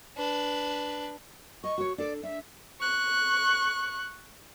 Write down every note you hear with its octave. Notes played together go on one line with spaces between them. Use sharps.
D4 B4
D#5 C#6
F#4 C#5
D4 A4 D5
D4 E5
C#6 F#6